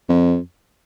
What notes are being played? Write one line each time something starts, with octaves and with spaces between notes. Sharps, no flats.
F2